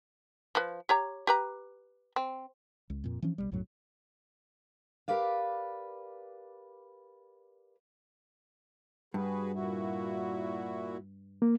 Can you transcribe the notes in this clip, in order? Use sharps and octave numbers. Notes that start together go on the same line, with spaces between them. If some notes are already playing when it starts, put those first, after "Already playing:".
F3 B4
G4 C#5 A#5
G4 B4 A#5
C4
C#2
F2 A#2
E3 F3 C#4
B1 E2 G3
B1 F#2 A2 F#3
G4 A#4 B4 D5 F5
G2 F#4 G#4 B4
A#2 E4 F#4
A#3